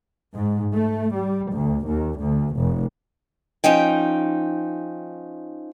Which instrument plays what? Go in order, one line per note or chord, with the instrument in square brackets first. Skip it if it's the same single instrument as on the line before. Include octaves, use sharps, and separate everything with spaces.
[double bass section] G#2
A3
G3
D2
D#2
D2
F1
[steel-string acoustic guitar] F3 C#4 D#4 G5